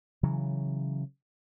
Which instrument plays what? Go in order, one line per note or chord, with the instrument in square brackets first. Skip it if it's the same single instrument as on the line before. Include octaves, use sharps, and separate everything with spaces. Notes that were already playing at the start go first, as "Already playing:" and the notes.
[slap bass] C#3 E3 F#3